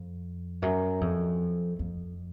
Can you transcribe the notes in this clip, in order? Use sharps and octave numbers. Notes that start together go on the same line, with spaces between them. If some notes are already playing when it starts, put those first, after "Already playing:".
Already playing: F2
F#2
F2
F2